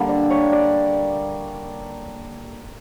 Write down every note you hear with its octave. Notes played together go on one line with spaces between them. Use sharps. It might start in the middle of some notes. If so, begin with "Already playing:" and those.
Already playing: D3 G3 A#3
D5
C#5
D5